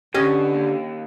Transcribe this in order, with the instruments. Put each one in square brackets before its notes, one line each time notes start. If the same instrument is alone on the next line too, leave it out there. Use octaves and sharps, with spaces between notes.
[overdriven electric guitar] B2 [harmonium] D3 [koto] C#4 D#5 [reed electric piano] G4
[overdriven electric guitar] D#2